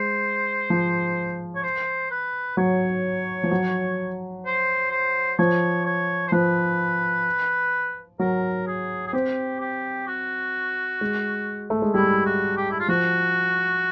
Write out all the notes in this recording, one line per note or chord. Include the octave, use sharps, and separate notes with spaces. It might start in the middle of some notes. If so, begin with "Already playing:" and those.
Already playing: G#3 C5
F3
C#5
C5
B4
F#3 C#5
F3
F#3
C5
C5
F3 C#5
C#5
C5
F3 B4
F#3 A#4
G#4
G#4
C4 G4
G4
F#4
G#3
A3
G#3
G3 E4
F#4
G4
E4
F4
F3 F#4